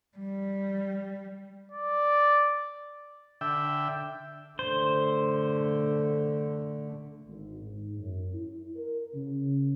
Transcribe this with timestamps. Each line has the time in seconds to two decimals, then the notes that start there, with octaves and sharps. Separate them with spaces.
0.18 G3
1.72 D5
3.41 D3 E5 G5
4.59 D3 A3 C5
7.27 G#1
7.61 G#2
7.98 F#2
8.32 E4
8.76 A#4
9.14 C#3